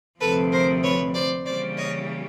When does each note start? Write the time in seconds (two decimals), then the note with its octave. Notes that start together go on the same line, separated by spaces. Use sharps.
0.21 D2 C3 F3 A4 B4
0.52 A#4 C5
0.84 B4 C#5
1.15 C5 D5
1.46 C#3 E3 G3 A#3 C#4 C5 D5
1.77 C#5 D#5